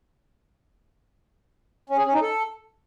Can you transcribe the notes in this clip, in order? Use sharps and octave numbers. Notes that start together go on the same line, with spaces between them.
C#4
G#4
C#4
D#4
A4